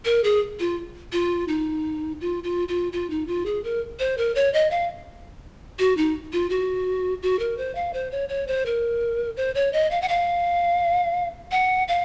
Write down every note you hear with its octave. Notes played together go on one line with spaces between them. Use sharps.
A#4
G#4
F4
F4
D#4
F4
F4
F4
F4
D#4
F4
G#4
A#4
C5
A#4
C#5
D#5
F5
F#4
D#4
F4
F#4
F#4
A#4
C5
F5
C5
C#5
C#5
C5
A#4
C5
C#5
D#5
F5
F#5
F5
F#5
F5